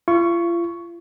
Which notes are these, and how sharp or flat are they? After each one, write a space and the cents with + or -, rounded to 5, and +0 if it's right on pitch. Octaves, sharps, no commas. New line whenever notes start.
F4 -40 C#6 +0